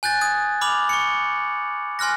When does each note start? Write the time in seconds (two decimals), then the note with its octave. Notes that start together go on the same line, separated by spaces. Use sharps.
0.03 G#5 F#6 G6 A6
0.21 D#6 G#6
0.61 B5 D6 F6 F7 F#7
0.89 C#6 C#7
1.99 G#5 C6 F6 F#6 A#6